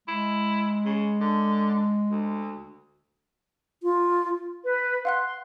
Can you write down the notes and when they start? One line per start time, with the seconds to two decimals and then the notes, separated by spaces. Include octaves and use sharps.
0.08 G#3 E4
0.85 C#3
1.21 D3
2.09 D2
3.83 F4
4.64 B4
5.05 F5 F#5 C6 F#6